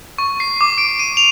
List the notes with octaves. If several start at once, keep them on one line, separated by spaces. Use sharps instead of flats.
C#6
C7
D6
D7
D#7
F7